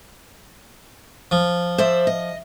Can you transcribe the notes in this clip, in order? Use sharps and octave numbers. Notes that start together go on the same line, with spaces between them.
F3
C5 D5 E5
D#5